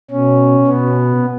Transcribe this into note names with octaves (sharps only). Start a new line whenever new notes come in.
B2 C#4
B2 B3